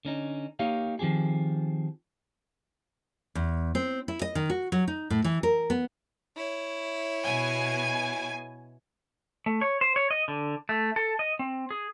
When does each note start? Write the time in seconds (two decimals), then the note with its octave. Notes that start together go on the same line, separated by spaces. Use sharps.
0.05 D3 C#4 D#4
0.59 A#3 D#4 G4 C#5 F5
0.99 D#3 F3 C4 G4 G#4
3.35 E2
3.75 C4
4.08 E4
4.22 D#5
4.35 D#3
4.50 F#4
4.72 F#3
4.88 D#4
5.10 A2
5.24 E3
5.43 A#4
5.70 B3
6.36 E4 C#5
7.24 B2 G#5
9.46 A3
9.61 C#5
9.81 C5
9.96 C#5
10.11 D#5
10.28 D3
10.69 A3
10.96 A4
11.19 D#5
11.39 C4
11.71 G#4